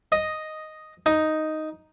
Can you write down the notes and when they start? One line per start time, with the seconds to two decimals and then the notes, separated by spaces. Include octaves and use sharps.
0.12 D#5
1.06 D#4